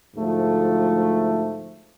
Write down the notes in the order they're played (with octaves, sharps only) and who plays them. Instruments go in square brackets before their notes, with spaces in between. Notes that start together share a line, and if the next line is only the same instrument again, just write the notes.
[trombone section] D2 G#2 F3 A3